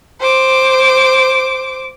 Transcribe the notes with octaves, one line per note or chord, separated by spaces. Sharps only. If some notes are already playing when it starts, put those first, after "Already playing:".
C5 D6